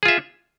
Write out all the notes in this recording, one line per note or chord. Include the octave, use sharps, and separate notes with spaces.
F4 G#4 E5